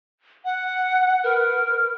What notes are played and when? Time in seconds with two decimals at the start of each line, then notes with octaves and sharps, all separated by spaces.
0.45 F#5
1.24 A#4 B4